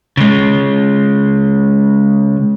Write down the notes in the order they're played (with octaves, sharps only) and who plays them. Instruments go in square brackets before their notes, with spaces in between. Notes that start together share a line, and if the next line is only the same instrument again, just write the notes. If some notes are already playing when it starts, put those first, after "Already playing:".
[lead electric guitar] C#3 G#3